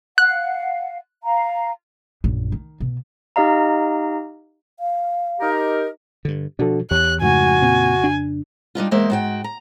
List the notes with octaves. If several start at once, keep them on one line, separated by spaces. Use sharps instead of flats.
F5 F#5 F#6
F5 A#5
A#1 F#2
D#3
B2
D#4 G4 D#5 F5 A#5
F5
D#4 G4 A#4
G2 D3
B2 F3 D4 F#4 A4
E2 G4 C#5 F#6
F2 G#2 C#3 F3 A3 F#4 G#5
A#2 C4
D4
G3 D4 D#4 F4
E2 G#3 A#3 C5 E5
G#2 F#4 G5
A#5